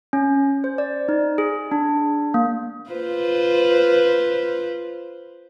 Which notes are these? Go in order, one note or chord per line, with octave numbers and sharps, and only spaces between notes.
C#4
C5
D5
D#4
G#4
D4
A#3
F4 B4 C5